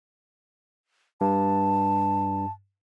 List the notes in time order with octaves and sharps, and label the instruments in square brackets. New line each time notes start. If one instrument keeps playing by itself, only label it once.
[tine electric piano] G2 [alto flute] A5